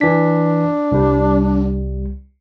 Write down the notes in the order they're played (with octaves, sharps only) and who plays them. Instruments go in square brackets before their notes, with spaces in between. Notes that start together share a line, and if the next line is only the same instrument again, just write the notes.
[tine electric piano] E3 B6 [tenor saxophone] D4
[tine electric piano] C2 G3